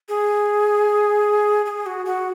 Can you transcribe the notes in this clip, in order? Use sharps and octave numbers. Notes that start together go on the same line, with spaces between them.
G#4
G#4
F#4
F#4